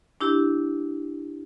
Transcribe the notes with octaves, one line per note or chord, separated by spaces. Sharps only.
D4 E4 G4